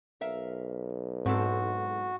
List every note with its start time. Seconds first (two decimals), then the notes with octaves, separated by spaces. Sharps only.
0.21 B1 A#4 E5 F5
1.26 G#2 C4 E4 F#4 A4